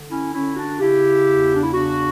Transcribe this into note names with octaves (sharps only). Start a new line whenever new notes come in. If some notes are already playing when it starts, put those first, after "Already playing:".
Already playing: D3
C#4 E4
D3 C#4 E4
D4 F#4
C#3 E4 G4
E2
D4
E4
C#3 D4 F#4